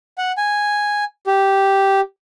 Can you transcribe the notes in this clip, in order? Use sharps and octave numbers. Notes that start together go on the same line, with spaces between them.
F#5
G#5
G4